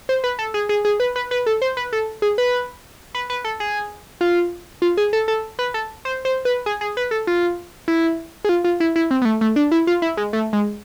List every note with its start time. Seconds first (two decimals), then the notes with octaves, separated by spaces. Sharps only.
0.09 C5
0.24 B4
0.39 A4
0.54 G#4
0.69 G#4
0.85 G#4
1.00 B4
1.16 B4
1.31 B4
1.46 A4
1.62 C5
1.77 B4
1.93 A4
2.22 G#4
2.38 B4
3.15 B4
3.30 B4
3.44 A4
3.60 G#4
4.21 F4
4.82 F4
4.97 G#4
5.13 A4
5.28 A4
5.59 B4
5.74 A4
6.05 C5
6.25 C5
6.45 B4
6.66 G#4
6.81 G#4
6.97 B4
7.11 A4
7.27 F4
7.88 E4
8.45 G#4
8.49 F4
8.64 F4
8.80 E4
8.96 E4
9.11 C4
9.22 B3
9.25 A3
9.41 A3
9.56 D4
9.72 E4
9.87 F4
10.02 E4
10.17 G#3
10.33 A3
10.53 G#3